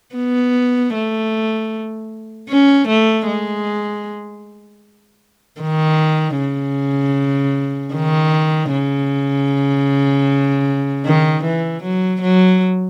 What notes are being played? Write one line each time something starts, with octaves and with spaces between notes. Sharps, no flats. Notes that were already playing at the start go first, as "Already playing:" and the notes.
B3
A3
C#4
A3
G#3
D#3
C#3
D#3
C#3
D#3
E3
F#3
F#3